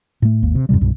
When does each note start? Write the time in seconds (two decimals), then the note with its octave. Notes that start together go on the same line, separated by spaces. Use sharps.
0.22 A2 A3
0.42 G#1 D#2 A#3
0.55 C3
0.69 F2 G#2 C3 G3
0.81 C2 G2 B2